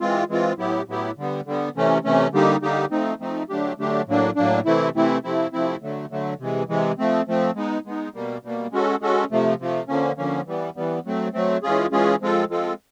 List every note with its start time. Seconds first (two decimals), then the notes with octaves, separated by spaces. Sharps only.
0.01 E3 G#3 C4 F4
0.29 E3 G#3 C4 F4
0.58 A2 F#3 B3 E4 G4
0.88 A2 F#3 B3 E4 G4
1.17 D3 G3 B3
1.46 D3 G3 B3
1.75 C3 E3 A3 C#4
2.05 C3 E3 A3 C#4
2.33 D3 G3 A#3 D#4 G4
2.62 D3 G3 A#3 D#4 G4
2.91 F3 A3 C4 D#4
3.20 F3 A3 C4 D#4
3.49 D3 F#3 A3 D4 G4
3.78 D3 F#3 A3 D4 G4
4.07 A2 F#3 A#3 D4
4.36 A2 F#3 A#3 D4
4.66 C3 E3 A3 C4 E4
4.95 C3 E3 A3 C4 E4
5.24 C3 F3 A3 C4 E4
5.53 C3 F3 A3 C4 E4
5.82 D3 F#3 A3
6.11 D3 F#3 A3
6.39 C3 E3 G#3
6.69 C3 E3 G#3
6.99 F3 A3 C4
7.28 F3 A3 C4
7.56 G#3 B3 D#4
7.86 G#3 B3 D#4
8.14 B2 G3 A#3
8.43 B2 G3 A#3
8.72 G#3 C#4 F#4 A4
9.01 G#3 C#4 F#4 A4
9.31 C3 F3 A3
9.60 C3 F3 A3
9.88 D3 F3 A#3 C#4
10.17 D3 F3 A#3 C#4
10.47 E3 G3 B3
10.76 E3 G3 B3
11.05 F#3 A3 C4
11.33 F#3 A3 C4
11.63 E3 G#3 C#4 F4 G#4
11.92 E3 G#3 C#4 F4 G#4
12.21 F3 G#3 C4 F4 A4
12.50 F3 G#3 C4 F4 A4